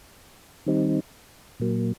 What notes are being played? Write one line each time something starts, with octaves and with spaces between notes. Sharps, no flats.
D#3 G3 C4 D#4
A#2 F#3 A#3